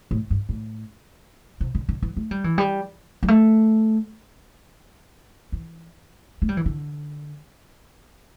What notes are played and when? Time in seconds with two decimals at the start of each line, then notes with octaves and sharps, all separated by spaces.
0.11 A2
0.30 G2
0.49 A2
1.60 C3
1.75 D3
1.89 D3
2.02 E3
2.17 A3
2.31 G3
2.44 E3
2.58 G3
3.23 G3
3.28 A3
5.52 E3
6.42 A3
6.49 G3
6.57 E3
6.66 D3